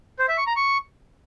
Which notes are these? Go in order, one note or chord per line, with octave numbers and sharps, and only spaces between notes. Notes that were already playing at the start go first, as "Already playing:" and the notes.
C5
E5
C#6
A#5
C#6